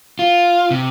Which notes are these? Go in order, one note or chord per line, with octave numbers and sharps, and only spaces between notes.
F4
C3